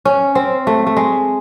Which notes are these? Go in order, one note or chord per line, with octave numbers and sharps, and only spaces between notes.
C#4
C4
A3
A3
G#3